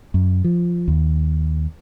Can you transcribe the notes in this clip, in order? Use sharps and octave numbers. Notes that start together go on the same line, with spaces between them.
F#2
F3
D#2